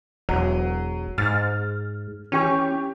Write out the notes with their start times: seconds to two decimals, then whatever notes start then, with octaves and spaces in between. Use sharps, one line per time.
0.29 E1 F#3
1.18 G#2 F6 A6
2.32 E3 C#4 G4 C#6